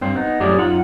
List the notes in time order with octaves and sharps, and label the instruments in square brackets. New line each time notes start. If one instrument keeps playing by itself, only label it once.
[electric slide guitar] G2 C4 C5
B3 D#4
F#2 A2 G4 G#4 D5
F#2 D#4 F4 F#5